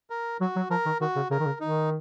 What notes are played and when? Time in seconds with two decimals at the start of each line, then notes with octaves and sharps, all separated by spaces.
0.10 A#4
0.41 F#3 F#4
0.56 F#3
0.70 F3 A#4
0.86 D#3
1.01 D#3 F#4
1.16 C#3
1.31 C#3 A#4
1.40 D#3
1.46 C#3
1.60 D#3 D#4